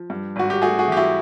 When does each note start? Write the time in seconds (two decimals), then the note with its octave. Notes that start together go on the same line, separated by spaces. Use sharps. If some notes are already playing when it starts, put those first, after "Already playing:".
Already playing: F3
0.10 G2
0.36 G#1 F#4
0.50 G4
0.62 A3 F#4 G#4
0.79 F#4 G#4
0.88 E3 G4
0.97 E4 F#4